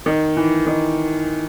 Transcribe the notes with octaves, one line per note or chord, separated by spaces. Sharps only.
D#3
E3
D#3